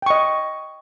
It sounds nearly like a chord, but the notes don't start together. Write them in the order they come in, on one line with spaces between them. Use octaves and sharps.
G5 C#6 D#5